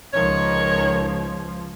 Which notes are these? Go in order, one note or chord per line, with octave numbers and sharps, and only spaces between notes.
C#2 D#3 F3 C#5